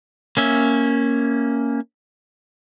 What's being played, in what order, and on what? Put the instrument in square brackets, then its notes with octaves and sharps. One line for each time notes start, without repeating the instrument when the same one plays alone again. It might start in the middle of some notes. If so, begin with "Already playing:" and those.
[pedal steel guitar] A#3 C#4 E5